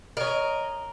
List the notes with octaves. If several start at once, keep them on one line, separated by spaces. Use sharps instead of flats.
C3 A#4 C#5 D#5